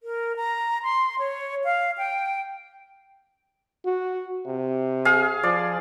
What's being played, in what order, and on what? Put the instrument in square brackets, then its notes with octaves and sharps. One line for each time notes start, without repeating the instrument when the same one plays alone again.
[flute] A#4
A#5
C6
C#5
F5
G5
[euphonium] F#4
C3
[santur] G#4 F5
[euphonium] F3 [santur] D5